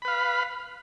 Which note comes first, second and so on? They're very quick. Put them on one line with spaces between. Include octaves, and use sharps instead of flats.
B5 B4 F5